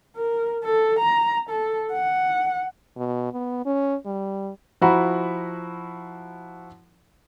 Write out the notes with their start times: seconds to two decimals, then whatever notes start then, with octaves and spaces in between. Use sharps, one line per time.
0.16 A#4
0.64 A4
0.99 A#5
1.50 A4
1.92 F#5
2.97 B2
3.33 B3
3.65 C#4
4.05 G3
4.81 F3 E4 F#4 A#5 B5